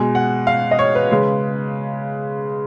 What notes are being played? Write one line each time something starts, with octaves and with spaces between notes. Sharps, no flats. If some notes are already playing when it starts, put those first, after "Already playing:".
Already playing: B2 G#3 G#5
F#5
F5
D#5
C#5
B4
C#3 G#3